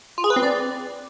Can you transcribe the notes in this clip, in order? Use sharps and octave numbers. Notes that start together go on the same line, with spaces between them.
F4
G#4
B4
C4
D5